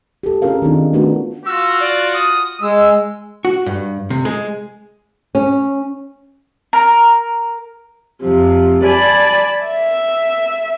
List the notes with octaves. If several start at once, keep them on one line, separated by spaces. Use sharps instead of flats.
G4 A4
C#4 F4 G#4 A#4 F5
D#3 C4 D4 D#4
A3 B3 D4 F4 F#4 A#4
F4 F#4 E6
D5
D#6
G#3 E6
F#4
G2
C3
G#3
C#4
A#4
F2 C3 F3
D5 G#5 A5 B5
E5